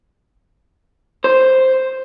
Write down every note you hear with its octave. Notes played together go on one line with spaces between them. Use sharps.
C5